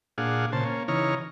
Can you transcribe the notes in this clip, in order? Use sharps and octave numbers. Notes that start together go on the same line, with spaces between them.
A#2 D4 G#4 F5 F#5
A#2 C#3 C5 A5
A#3 C#4
C#3 E3 D#4 C#5 A#5 F6